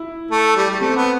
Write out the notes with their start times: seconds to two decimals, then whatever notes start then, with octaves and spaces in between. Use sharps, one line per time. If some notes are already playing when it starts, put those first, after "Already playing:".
Already playing: E4
0.31 A3
0.56 G3
0.70 G3
0.81 A3 C4
0.97 B3